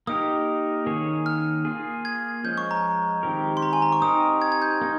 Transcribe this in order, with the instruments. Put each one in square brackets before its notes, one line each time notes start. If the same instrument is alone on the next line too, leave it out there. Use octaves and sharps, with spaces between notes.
[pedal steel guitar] A#3 D#4 G4 A#4 [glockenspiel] D#6
[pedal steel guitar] D#3 A#3 C#4 G#4 C#5
[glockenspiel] F6
[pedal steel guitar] A#3 F4 G#4
[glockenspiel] G#6
[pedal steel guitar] F3 G#3 C#4 [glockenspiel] G6
[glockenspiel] C#6
A#5
[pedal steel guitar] D#3 G#3 C4 G4 A#4
[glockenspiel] C6
A#5
G#5
A#5
C#6
[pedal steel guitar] C4 D#4 G4 A#4 [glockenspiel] D#6
[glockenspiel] G#6
G#6
G6
[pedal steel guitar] A#3 D#4